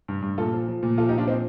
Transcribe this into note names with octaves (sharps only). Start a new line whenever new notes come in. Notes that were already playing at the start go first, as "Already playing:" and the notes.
G2
G2
A#2 F4 A4
F3
F3
A#2
F3 F4 A4
D#4 G4
A#2
D4 F4
F3 C4 D#4